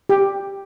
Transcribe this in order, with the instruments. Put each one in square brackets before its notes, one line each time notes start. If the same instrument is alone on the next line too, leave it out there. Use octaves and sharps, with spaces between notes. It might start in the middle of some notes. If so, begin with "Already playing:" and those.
[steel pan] G4